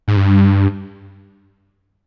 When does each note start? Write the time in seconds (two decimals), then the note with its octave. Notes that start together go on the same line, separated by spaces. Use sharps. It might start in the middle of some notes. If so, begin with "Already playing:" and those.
0.08 G#2
0.17 G2